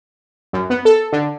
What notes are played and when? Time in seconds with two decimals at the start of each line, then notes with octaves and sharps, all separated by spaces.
0.53 F#2
0.70 B3
0.85 A4
1.13 D3